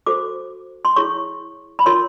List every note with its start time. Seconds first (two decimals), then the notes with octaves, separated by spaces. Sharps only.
0.07 F#4 A4 C5 D6
0.85 C6
0.96 E4 G#4 C#5 C#6
1.79 B5
1.86 F4 A#4 C#5 C6